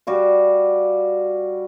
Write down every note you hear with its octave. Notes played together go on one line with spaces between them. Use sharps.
G3 F#4 F5